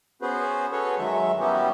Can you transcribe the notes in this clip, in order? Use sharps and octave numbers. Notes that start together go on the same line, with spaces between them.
B3 C#4 F#4 G#4 B4 C5
C#4 F#4 G#4 A4 B4 C#5
F#2 D#3 F#3 G#3 E5
G3 B3 C#4 E4 F#4 G4